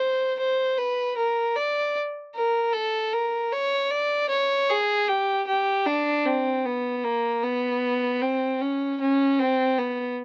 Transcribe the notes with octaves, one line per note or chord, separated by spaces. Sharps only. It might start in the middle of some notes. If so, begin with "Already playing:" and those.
Already playing: C5
C5
B4
A#4
D5
A#4
A4
A#4
C#5
D5
C#5
G#4
G4
G4
D4
C4
B3
A#3
B3
C4
C#4
C#4
C4
B3